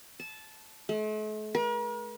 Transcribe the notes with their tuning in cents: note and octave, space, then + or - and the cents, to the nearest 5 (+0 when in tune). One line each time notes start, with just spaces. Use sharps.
A5 -15
A3 -45
A#4 +45